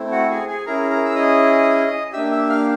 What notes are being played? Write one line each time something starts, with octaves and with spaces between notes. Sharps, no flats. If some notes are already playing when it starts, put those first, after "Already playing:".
Already playing: A3 C4 E4
F#4 F#5
G#4 G#5
G#4 G#5
C#4 E4 G#4 A#4 A#5
A#4 A#5
E6
D#5 D#6
A#3 D4 G4 E5 E6
E5 E6
F5 F6